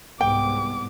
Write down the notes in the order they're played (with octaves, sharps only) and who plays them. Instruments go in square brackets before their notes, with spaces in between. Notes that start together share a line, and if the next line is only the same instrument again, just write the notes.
[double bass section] C2 G#2 B3 [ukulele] G5 [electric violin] D6